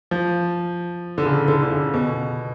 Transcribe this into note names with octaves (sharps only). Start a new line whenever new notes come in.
F3
D3
C#3
D3
D3
C#3
B2